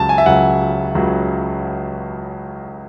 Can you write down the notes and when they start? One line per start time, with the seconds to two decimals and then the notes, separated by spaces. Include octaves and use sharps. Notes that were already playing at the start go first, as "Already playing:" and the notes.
Already playing: C#2 C#3 F#3 A5
0.09 G#5
0.18 E5
0.26 C#2 C#3 F#3 F#5
0.95 C#2 C#3 F#3